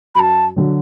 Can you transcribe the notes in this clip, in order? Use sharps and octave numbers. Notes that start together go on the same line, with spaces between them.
F#2 A5 B5
D3 F#3